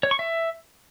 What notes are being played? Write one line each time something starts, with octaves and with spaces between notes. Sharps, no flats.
C#5
C#6
E5